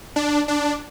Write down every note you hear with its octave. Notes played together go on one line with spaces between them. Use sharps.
D4
D4